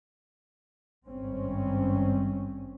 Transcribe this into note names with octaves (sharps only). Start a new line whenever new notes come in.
G#1 G2 C4 C#4